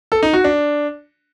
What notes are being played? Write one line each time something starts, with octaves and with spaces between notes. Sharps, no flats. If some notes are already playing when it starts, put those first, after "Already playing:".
A4
D#4
F#4
D4